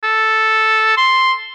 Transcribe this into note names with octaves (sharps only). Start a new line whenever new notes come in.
A4
C6